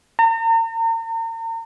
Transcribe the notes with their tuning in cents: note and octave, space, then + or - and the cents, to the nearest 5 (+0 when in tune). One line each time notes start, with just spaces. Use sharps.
A#5 -40